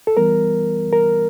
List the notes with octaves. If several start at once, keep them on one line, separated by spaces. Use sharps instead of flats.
A4
E3 G3 B3 A#4
A#4